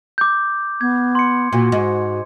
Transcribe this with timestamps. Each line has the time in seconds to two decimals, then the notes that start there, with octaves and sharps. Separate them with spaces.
0.18 D6 G6
0.81 B3 G#6
1.15 C6 C#7
1.53 A#2 F#4
1.72 G#2